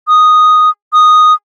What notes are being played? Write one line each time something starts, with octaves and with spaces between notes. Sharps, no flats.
D#6
D#6